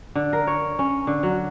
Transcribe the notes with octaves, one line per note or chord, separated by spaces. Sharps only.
D3
A#4
C#5
C#4
D3
F#3